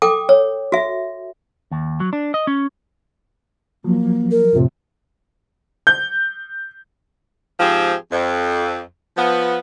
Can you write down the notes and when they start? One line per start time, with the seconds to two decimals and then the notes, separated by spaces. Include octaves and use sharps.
0.02 A4 G5 D6
0.29 C#5
0.72 F#4 E5
1.71 D#2
2.00 F#3
2.13 D4
2.34 D#5
2.47 C#4
3.84 F3 F#3 A#3
4.31 A#4
4.53 F2 A2 C3 F4
5.87 G6
7.60 G#2 F3 C4 G4 G#4
8.12 F2
9.17 F3 B3